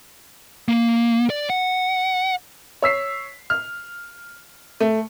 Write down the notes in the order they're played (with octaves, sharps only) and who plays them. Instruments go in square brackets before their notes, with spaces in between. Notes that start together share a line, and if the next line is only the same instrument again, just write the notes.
[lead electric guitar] A#3
D5
F#5
[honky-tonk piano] C#5 E6 B6 C7
F6
A3